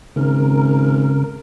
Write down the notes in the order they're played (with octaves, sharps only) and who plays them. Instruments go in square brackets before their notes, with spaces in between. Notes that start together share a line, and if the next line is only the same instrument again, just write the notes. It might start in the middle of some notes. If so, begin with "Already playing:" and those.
[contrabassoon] G#1 [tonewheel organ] C#3 A#4